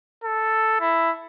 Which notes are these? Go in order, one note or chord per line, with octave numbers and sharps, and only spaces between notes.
A4
E4